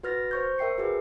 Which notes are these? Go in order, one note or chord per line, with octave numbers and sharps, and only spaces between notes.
F#4 B4 F6 A6 A#6
C5 C#6 G6
A#4 E5 G5 C7 C#7
F#4 G#4 B4